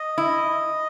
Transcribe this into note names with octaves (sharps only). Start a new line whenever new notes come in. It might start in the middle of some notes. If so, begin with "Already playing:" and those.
Already playing: D#5
E4